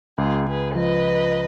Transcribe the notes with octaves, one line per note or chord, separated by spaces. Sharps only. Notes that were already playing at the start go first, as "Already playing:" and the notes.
C#2 F4 G#4
C#2 G#4 B4
F3 B4 D#5